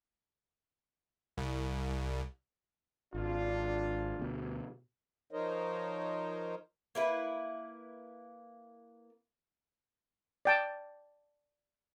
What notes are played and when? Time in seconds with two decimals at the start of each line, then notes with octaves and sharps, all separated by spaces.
1.37 C2
3.14 G#1 D4 F4
4.19 D2 B2
5.31 F3 D#4 A#4 C5 C#5 D#5
6.95 A#3 E4 B4
10.45 D5 G5 A5